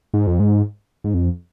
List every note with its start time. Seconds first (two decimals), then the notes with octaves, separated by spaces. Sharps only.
0.14 G#2
0.27 F2
0.40 G#2
1.04 G#2
1.14 F2